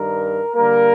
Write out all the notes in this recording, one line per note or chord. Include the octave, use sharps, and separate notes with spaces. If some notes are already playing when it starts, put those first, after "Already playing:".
Already playing: G2 D#3 G3 A#4
D3 G3 A#3 A#4